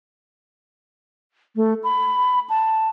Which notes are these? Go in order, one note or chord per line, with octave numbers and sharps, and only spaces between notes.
A3
B5
A5